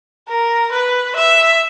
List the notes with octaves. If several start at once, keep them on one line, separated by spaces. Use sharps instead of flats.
A#4
B4
E5